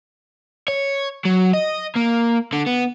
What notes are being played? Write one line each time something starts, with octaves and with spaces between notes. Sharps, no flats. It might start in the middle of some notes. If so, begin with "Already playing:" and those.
C#5
F#3
D#5
A#3
D3
B3